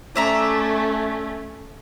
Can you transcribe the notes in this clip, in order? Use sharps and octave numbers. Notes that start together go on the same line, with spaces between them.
A3 C#4 D5 E5 A#5